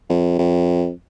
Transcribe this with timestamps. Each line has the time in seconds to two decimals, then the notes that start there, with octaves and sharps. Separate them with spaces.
0.09 F2
0.39 F2